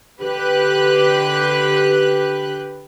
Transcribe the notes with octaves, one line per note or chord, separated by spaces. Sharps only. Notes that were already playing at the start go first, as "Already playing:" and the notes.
D3 G4 B4 F#6